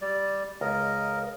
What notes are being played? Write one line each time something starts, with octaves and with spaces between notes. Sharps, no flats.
G3 D5
C#2 A#4 D#5